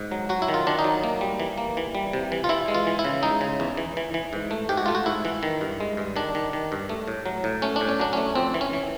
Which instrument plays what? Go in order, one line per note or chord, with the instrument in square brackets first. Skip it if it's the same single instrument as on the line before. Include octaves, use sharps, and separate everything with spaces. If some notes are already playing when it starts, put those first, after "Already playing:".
Already playing: [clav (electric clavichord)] G#2
F#3
F#3 F#4
E4
D#3
F4
D#3 D4
D#4
F#3
A#3
G3
E3
A#3
E3
G3
C3
E3
F4
E3 E4
G#3
F4
E3
E4
C#3
G#3 D#4
C#3
E2
E3
E3
E3
G#2
A3
G#2 G4
F#4
A3 F4
F#4
G#2 E4
E3
D#3
G2
G#3
G2
D#3 D4
D#3
D#3
G2
A3
A2
F#3
A2
A3 C#4
D4
A2
C#4
F#3 D4
A3 C#4
F2 C4
E3
C#4
E3